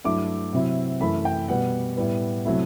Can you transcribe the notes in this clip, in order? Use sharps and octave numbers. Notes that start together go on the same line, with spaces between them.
G2 F#3 A3 E4 D6
C3 F#3 C4 E4
F#2 E3 A3 E4 B5
G5
B2 G3 B3 F#5
A2 G3 B3
C3 F#3 A3 C4 E4